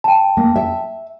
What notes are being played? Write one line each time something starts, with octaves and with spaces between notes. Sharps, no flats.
G5 A5
A#3
E5